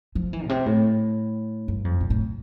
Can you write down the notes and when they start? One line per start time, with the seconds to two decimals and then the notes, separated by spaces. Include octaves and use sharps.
0.15 F3
0.33 E3
0.45 A#2
0.49 C3
0.66 A2
1.68 G2
1.85 F2
2.01 A#2
2.10 A2